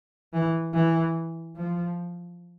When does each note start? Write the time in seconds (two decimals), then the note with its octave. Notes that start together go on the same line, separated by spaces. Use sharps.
0.33 E3
0.74 E3
1.57 F3